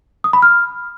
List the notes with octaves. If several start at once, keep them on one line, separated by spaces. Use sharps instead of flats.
D#6
B5
F6